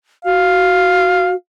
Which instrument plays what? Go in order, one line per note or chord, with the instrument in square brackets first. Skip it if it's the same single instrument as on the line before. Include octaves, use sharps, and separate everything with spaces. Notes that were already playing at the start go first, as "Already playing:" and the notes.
[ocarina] F#4 [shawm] F5